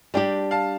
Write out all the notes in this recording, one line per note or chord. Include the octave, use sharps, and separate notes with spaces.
G3 D4 G4 D5 G5
F5 A5